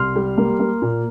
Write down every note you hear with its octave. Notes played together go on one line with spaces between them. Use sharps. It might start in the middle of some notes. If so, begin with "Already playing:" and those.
Already playing: C2 C6 F6
G3
A#3
A#3
A#2